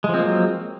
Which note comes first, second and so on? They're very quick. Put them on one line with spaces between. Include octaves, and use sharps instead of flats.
G#3 F3 C4 A#3 F#3